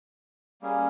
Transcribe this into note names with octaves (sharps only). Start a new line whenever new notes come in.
G3 A#3 C#4 G#4